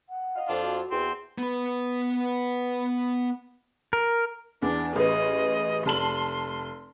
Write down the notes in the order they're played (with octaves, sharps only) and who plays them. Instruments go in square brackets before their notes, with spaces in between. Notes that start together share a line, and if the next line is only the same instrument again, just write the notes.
[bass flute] F#5
[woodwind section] D#5 F5
[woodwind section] F2 [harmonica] D4 F4
[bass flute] F#4
[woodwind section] E2 [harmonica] C4 C6
[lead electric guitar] B3 B4
[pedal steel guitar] A#4
[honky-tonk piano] E2 [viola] D4
[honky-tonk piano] A1 B4 [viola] G#4 D#5
[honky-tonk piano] F1 A5 F#7 [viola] C6